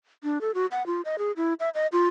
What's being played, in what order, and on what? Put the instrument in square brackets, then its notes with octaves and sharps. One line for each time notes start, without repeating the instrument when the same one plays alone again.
[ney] D4
A4
F#4
F#5
F4
D#5
G#4
E4
E5
D#5
F4